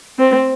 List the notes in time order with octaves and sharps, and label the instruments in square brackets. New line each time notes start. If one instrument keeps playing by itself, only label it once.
[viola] C4